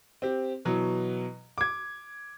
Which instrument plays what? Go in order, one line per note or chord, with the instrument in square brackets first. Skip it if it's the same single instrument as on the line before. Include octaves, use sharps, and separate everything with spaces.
[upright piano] C4 G4
B2 E3 F#3
D6 G#6